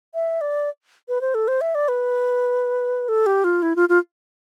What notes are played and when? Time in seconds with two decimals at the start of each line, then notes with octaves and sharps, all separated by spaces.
0.14 E5
0.41 D5
1.08 B4
1.21 C5
1.35 A4
1.48 C5
1.61 E5
1.75 D5
1.88 B4
3.09 A4
3.26 G4
3.44 F4
3.62 E4
3.76 F4
3.89 F4